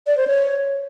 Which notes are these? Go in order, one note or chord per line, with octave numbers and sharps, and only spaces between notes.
D5
C5
C#5